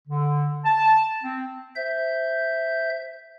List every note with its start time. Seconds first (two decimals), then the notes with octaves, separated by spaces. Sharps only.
0.08 D3
0.65 A5
1.23 C4
1.76 C5 E5 G6